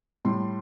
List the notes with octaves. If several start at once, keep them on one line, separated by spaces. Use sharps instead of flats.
A2 G3 C6